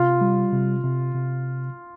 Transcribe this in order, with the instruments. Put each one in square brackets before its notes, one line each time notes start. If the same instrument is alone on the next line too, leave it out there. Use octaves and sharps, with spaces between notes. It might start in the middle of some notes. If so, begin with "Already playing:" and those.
Already playing: [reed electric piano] C3 [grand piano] F4
[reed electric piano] G3
C3
C3
C3